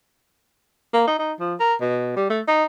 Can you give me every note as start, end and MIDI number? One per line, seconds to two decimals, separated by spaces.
0.94 1.04 58
1.07 1.15 63
1.19 1.33 63
1.39 1.54 53
1.60 1.74 70
1.81 2.15 47
2.16 2.25 55
2.30 2.41 57
2.48 2.64 63